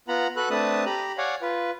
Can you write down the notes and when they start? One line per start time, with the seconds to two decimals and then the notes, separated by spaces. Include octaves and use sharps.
0.08 B3 F4 F#5 A#5 B5
0.36 F#4 A4 B4 B5 F#6
0.50 A3 C4 D4 B4 A5 D#6
0.86 G4 A#5 B5
1.18 C#5 D5 F5 F#5 G#5
1.42 F4 B4